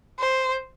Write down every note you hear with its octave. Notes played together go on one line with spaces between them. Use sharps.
C5